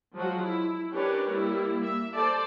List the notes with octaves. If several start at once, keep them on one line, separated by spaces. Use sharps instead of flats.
F3 F#3 G#3 F#4
E4
C#4 D4 G4 A#4 B4 C#5
G3 A#3 E4
A#3 E5
A4 C5 D5 A5